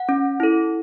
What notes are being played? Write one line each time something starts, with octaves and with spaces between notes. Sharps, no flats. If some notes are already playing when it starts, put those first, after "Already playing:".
Already playing: F#5
C#4
E4 A4